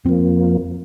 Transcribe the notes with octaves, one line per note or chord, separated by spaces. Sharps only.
F2 F3 A#3 C4